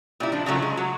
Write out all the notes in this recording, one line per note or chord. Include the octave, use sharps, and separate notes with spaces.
A#2 G3 E4
F3 D4
C#3 F3 F#3 A3
G#3
F#3